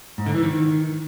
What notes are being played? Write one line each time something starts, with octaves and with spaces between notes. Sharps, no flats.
G#2
D3
E3
D#3